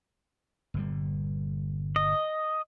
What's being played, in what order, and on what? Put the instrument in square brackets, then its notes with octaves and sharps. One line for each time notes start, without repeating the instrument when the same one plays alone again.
[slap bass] G1 A#2 G3
[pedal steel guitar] D#5